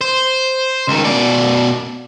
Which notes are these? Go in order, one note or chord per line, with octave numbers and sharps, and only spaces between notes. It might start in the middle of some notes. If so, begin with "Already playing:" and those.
C5
C#2 D#3
B2 D5